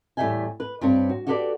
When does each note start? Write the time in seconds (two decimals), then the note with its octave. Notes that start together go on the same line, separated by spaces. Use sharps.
0.17 E2 A2 G3 E5 G5 G#5
0.60 B4
0.81 G2 C4 C#5
1.09 F#4
1.27 F#4 G4 A4 B4 C5 D5